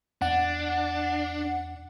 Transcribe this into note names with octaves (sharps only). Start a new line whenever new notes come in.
E2 D4 F#5